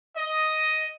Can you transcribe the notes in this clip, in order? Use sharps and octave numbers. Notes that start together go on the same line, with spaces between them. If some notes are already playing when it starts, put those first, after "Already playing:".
D#5